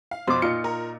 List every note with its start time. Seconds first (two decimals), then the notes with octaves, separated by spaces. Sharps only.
0.11 F5
0.27 F2 B2 C5 D6
0.42 A#2 D#4 F4 C#7
0.64 A#4